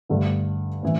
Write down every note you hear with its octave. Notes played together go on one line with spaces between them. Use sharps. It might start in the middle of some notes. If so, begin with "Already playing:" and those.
G2 D3 A3
A2 E3